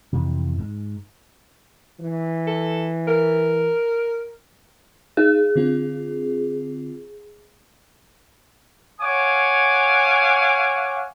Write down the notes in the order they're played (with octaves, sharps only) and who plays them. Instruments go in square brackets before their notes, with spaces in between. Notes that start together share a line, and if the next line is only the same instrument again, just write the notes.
[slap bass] F2 C3 E3
G#2
[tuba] E3
[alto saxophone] A4
A#4
[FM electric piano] D#4 [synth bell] G#4
[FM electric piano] D3 C4 F4
[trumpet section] C#5 F5 F#5 G#5 D6